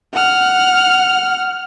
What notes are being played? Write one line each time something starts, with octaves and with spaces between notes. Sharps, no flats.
F#5 F6